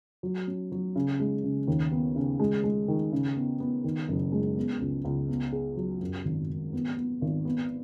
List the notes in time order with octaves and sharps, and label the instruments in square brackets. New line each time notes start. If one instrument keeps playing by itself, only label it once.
[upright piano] F#3
C#4
F#3
C#3
G#3
C#3
D#2
B3
C#3
G#3
G#3
D#3
C#3
B3
B3
D#3
F#1
G#3
B3
C#2
C#2
B3
G#4
F#3
F#2
G#1
G#1
B3
B3
G#1
B3